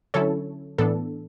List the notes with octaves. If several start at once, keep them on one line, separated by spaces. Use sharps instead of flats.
D3 F#3 C#4 E4 A4 C#5
A2 E3 B3 D4 A4